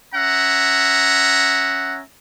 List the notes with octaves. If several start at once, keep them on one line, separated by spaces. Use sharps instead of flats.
C#4 E5 F#5 A#5